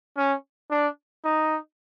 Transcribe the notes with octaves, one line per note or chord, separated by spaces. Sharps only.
C#4
D4
D#4